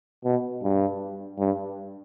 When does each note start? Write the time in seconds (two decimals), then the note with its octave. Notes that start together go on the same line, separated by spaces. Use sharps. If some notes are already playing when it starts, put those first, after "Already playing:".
0.25 B2
0.63 G2
1.39 G2